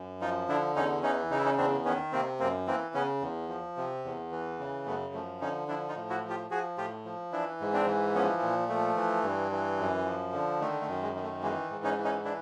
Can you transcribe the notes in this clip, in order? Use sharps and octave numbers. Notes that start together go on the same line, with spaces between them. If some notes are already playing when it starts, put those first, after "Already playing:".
Already playing: F#2
F3 D#4 F4
D3 D4 E4
E2 C#4 D#4
E3 C#4 D#4
C#3 D#4
E4
C#4 D#4
E2 C4 D4
D#3 B3 C#4
C3 A#3 C4
F#2 A#3 C4
E3 A#3 C4
C#3 B3 C#4
E2
F3
C3
E2
E3
C#3
F#2 A3 B3
F3 A3
D3 C#4 D#4
F3 D4 E4
D#4 F4
A2
E4 F#4
F3
F4 G4
F3 F#4 G#4
A2 F4 G4
F3
E3 D4 E4
G#2
C4 D4
E3
F3 B3 C#4
A#2
F3 A3
E3
G2
E3
F#2
F3
D3
D#3 A3
A3
F#2
G#3
D#3
A3
E3 G#3 A#3
G#2
C#4 D#4
E3
C#4 D#4
E3 D4 E4